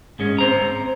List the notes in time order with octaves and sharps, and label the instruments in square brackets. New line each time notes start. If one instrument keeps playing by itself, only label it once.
[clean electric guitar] G#2 G#3 C#4
C4 C5 A#5